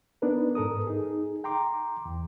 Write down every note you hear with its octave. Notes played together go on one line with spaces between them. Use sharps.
B3 D4 D#4 A#4 B4
G#2 A4 A#4 D#6
D#4 G#4
G5 A#5 C6 D6
E2